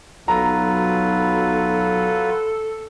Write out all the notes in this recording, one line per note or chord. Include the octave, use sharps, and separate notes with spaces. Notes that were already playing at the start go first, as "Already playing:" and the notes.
B1 F#3 F4 A4 B4 A#5